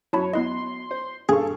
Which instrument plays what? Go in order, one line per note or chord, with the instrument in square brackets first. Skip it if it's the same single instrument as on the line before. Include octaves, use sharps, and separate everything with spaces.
[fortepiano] F#2 F#3 [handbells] E4 A5 B5 [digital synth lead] C#5
[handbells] B3 E4 D#5 [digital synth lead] C6
[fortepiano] C5
[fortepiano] G2 F5 C#6 [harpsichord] G#4 [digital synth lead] A4